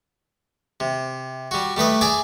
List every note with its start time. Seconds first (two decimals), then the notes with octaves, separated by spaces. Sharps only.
0.80 C3
1.51 G3 F#4
1.76 G3 A3 B4 D#5
2.01 G#4 D5 E5 G#5 A#5